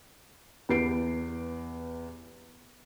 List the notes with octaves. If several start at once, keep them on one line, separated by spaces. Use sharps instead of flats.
E2 G4 B4 C7 D7